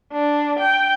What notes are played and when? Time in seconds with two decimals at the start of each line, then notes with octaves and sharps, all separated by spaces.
0.12 D4
0.59 G5